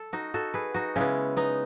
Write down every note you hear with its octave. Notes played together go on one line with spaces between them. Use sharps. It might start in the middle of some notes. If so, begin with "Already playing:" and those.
Already playing: A4
D#4 F#4
F#4 A4
G#4 B4
D#4 F#4
C#3 G#3 B3 C#4 E4
B3 D#4